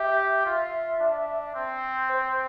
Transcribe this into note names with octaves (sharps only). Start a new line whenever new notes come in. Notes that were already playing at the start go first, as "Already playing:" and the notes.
Already playing: G4 E5
F4
D4
C4
C5